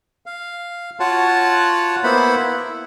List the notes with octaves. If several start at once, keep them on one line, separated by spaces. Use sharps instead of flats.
F5
F4 F#4 C#5 F#5 A5
A#3 B3 E4 C5 F#5 B5
E4